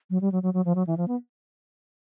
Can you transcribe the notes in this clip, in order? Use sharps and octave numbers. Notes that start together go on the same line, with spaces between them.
F#3
G3
F#3
F#3
F#3
F3
F#3
E3
F3
B3